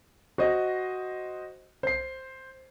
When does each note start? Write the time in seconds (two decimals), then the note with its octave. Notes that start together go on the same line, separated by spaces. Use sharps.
0.38 F#4 C5 D#5
1.83 C5 C7